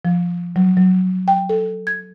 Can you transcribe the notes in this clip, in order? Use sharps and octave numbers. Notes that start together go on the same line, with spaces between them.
F3
F#3
F#3
G5
A4
G#6